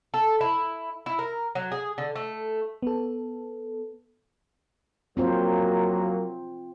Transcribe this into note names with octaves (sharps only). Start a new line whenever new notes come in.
A4
E4
E4
A#4
F#3
G#4
D3
A3
B3 A4
F#3 A#3 C4 F4 C5